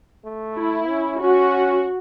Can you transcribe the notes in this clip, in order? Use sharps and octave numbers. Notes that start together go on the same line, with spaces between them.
A3
E4
C#4
C#4 F#4